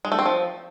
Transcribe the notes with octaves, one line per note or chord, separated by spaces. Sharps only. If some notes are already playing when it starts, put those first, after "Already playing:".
G#3
A3
C4
F3